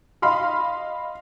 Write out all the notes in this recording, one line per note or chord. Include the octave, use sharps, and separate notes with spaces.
D#5 F5 B5 C6 F6